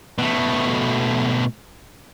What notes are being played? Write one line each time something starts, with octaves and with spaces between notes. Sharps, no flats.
B2 A3